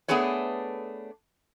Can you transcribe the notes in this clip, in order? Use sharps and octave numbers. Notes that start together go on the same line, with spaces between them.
A3 B3 D4 G#4 B4 C#5